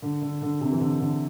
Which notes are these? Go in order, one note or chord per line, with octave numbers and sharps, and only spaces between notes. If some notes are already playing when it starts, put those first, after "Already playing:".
D3
D3
D3
C3
E3
D3
D3